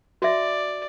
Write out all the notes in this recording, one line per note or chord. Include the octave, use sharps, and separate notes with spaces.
F#4 D5 E5